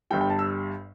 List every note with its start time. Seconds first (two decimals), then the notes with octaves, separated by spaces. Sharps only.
0.11 G1 G2 G3 G5
0.21 G5
0.30 A5
0.39 E6